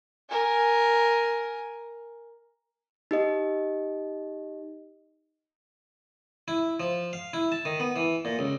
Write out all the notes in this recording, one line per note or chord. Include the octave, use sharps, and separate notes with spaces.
A#4 G#5
D#4 G4 D#5
E4
F3
F5
E4
A5
D#3
B3
E3
A#2
C#2